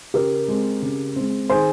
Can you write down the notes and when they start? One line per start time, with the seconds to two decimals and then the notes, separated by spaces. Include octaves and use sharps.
0.14 C#3 G4 A#4
0.48 G#3 C4
0.82 C#3
1.16 G#3 C4
1.50 D#3 G#4 C5